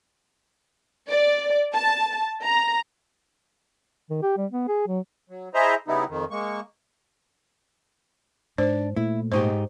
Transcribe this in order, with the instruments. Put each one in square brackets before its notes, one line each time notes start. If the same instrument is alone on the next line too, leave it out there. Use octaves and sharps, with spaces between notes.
[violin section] D5
A5
A#5
[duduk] D#3
G4
G3
B3
G#4
F#3
[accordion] F#3
E4 G#4 C5 D#5 E5 A#5
C#3 G3 B3 D#4 E4
F2 D#3
G#3 A#3 C#6
[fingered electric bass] G#2 [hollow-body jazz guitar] D4 [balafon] C5
[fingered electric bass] A#2 A3 [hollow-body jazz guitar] E4
[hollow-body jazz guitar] G#2 D#4 G4 [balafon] C5 C#6